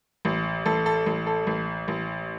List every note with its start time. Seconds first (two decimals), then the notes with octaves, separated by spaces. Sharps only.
0.25 A1
0.66 A1 A4
0.86 A4
1.06 A1
1.27 A4
1.47 A1
1.88 A1